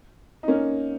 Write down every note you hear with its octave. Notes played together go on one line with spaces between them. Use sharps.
D#4
A#3 C#4